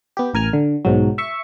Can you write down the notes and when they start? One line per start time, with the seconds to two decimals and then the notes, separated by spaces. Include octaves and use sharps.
0.17 B3 G4
0.34 A1 A#4 G#5 F6
0.53 D3
0.85 B1 G#2 F#3
1.18 E5 C#6